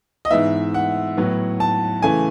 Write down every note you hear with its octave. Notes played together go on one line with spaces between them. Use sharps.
D#5
G#2 E3 B3 E5
F#5
A2 F#3 B3
A5
C#3 E3 A3 G#5